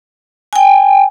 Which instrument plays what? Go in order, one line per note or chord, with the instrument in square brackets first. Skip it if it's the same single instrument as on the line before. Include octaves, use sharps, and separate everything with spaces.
[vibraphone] G5 G#5